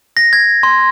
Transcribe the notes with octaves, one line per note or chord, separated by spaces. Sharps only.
A#6
G#6
C6